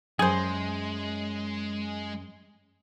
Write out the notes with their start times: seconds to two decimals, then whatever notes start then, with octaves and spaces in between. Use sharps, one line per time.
0.19 F#2 G#3 G#4 C5